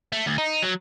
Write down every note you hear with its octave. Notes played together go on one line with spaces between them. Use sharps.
A3
D2
D#4
F#3